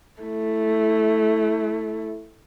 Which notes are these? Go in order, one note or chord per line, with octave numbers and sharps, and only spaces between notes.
A3 E4